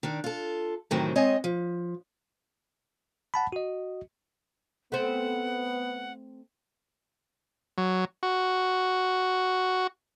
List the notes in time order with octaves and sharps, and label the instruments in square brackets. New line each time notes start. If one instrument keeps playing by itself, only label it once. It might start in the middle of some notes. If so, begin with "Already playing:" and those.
[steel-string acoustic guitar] D#3 D4
F4 A4
A2 C3 D#3 E3 F#3 C4
G#3 C4 C#5 D#5 G#5
F3
[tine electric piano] F#5 A5 B5
F#4 D#5
[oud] A3 C4 [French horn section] B3 [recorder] F#5
[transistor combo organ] F#3
F#4